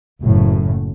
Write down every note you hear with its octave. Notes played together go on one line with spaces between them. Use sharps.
F#1 F#2 A2